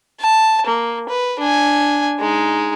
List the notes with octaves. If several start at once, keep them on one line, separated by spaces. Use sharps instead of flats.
A5
A#3
B4
D4 G#5
G#3 D#4